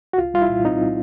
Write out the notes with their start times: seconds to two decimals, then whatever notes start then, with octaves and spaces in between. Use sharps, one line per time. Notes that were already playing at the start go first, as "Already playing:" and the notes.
0.13 F#4
0.18 C2 F4
0.34 G3 F4
0.42 E4
0.49 A#2
0.65 C4 D#4